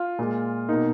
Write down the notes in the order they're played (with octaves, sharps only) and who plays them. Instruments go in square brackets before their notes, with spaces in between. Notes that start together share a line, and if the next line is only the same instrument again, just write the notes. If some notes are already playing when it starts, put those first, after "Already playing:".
Already playing: [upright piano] F4
A#2 G#3
B2 A#3 D#4